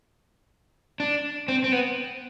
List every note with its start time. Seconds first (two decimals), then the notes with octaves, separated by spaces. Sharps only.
1.00 D4
1.48 C4
1.64 C4
1.72 B3